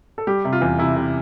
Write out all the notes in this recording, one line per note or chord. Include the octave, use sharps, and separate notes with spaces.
A4
G3 G4
C3
F4
E2
C3 E4
C3